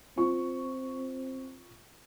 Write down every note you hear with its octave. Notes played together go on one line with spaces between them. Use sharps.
C4 F4 C#6